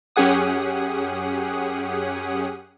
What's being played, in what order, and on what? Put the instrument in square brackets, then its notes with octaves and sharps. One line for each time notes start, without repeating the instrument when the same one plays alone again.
[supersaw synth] F#2 C#4 G4 G#4 F#5 D#6